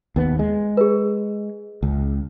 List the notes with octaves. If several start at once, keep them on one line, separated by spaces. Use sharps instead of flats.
D#2 B3
G#3
G#4 B4
C#2